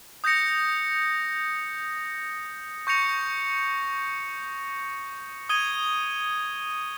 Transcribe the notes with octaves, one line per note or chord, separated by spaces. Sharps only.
D#6 G6 A#6 C#7
C#6 G6 A#6 C#7 F7
D#6 G#6 D#7 G7